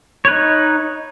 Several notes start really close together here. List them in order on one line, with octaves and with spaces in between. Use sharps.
C#5 B4 D#4